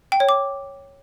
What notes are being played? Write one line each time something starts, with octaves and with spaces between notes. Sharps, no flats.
G5
C#5
D6